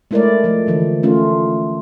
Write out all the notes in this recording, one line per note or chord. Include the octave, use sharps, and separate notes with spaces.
G#3 A3 E4 A#4 C#5 D5
F3 A3
D3 E3 F3
A3 C#4 F4